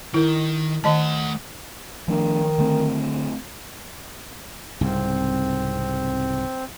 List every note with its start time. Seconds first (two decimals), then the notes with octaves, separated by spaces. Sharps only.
0.14 D#3 E4 A#4
0.84 D#3 A3 D#5 F#5 A5
2.08 D#3 F3 A3 D4
2.58 D3 A3 C4
4.81 C2 G#2 C#3 C4